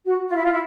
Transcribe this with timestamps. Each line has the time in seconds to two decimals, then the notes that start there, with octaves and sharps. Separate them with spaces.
0.05 F#4
0.29 F4
0.35 E4
0.43 F4
0.51 E4